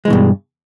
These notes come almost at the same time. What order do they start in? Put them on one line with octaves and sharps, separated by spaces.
G#3 E3 B2 G2